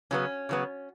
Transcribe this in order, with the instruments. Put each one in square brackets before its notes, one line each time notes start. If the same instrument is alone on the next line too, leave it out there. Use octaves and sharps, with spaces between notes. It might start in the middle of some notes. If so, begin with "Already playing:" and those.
[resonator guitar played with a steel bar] C#3 F#3 B3 C#4
C#3 F#3 B3